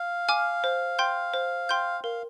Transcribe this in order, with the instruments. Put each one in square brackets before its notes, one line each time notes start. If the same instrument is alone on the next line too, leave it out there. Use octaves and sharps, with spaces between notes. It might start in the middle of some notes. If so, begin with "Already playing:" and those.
Already playing: [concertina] F5
[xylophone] G#5 D6 F6
C5
G5 C6 G6
C5
G5 C6 G6
[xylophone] A#4 [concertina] F5